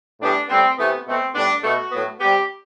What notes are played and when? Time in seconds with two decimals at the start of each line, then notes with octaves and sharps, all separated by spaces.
0.21 A2 E3 G3 B3 D4
0.49 A2 G3 B3 C4
0.78 C3 E3 A3 B3
1.07 B2 A3 C4
1.35 A2 G3 B3 D4
1.63 B2 A3 F#4
1.91 A2 F#3 B3
2.20 C3 G3 B3 G4